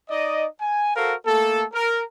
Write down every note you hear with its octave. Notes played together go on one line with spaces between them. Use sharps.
D#4 D5 D#5
G#5
F#4 A4 A#4 C5 F5
A3 A#3 A4
A#4